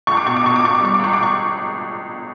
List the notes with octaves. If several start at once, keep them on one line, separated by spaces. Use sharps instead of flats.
C#2 C#6
D6
B2 C#6
D6
B2 C#6
D6
B2 C#6
D6
G3 C#6
D6
C#2 C#6
C#2 D6
C#6